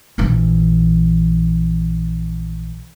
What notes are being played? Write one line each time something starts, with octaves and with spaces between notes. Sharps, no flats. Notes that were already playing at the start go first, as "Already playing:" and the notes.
A#1 E3